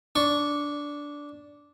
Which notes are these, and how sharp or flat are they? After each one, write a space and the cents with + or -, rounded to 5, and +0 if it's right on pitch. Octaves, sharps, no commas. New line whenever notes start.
D4 -10 C#6 +0